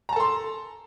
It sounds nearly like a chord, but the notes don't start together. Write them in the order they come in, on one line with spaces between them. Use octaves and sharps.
A#5 A5 A4 C6